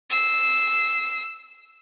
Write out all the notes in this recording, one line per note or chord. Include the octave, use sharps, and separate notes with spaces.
E6 C7